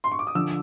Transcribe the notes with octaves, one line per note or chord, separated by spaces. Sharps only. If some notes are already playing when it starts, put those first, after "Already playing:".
C6
C#6
D6
D#6
D3 F3 E6